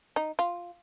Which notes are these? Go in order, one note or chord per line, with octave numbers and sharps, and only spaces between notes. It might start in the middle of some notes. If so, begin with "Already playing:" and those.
D#4
F4